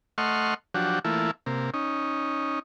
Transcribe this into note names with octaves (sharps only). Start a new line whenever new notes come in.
A3 D#5 F#5 C6 C#6 F6
F3 F#3 D4 F#4 G4
E3 A3 A#3 E4 F4
C3 A#3
C#4 D#4